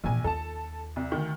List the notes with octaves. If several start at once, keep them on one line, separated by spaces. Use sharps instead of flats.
A#1 A#2 E3 G#5
D#2 F4 A4 A5
C2
D2 D#3